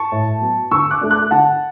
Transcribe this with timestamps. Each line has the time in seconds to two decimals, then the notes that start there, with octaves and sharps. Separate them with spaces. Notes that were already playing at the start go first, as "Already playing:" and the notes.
Already playing: A5 C#6
0.12 A2
0.41 F#3 B3
0.71 D3 C#6 E6
0.91 D6 F#6
1.01 A3 D4
1.11 D6 F#6
1.31 D3 F#5 A5